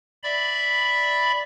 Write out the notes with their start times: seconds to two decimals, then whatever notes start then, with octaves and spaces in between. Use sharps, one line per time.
0.23 D5 E5 B5